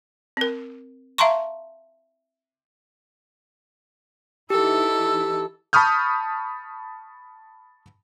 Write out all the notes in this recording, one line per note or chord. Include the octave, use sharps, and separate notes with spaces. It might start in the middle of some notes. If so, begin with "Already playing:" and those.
C4 A#4
E5 F5 A5 A#5 C6 C#6
E3 D#4 E4 G4 A4 E6
A5 B5 C#6 D#6 F6 G6